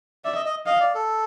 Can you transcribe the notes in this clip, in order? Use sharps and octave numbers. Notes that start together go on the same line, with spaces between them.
D5 E5
D#5
D#5
D#5 F5
D5
A4